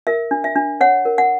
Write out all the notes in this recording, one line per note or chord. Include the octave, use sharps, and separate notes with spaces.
A#4 E5
D4
E5
D4
C#5 F#5
A#4
F#5